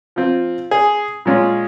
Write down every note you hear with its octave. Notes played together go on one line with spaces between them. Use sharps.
F3 C4 F4
G#4
A#2 G#3 C#4 F4